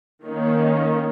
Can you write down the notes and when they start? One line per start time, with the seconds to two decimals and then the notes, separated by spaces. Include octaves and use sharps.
0.25 D#3 A#3 C#4